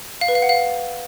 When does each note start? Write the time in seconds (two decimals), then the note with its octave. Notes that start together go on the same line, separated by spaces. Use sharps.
0.21 F5
0.28 B4
0.35 F5
0.42 F#5
0.49 F5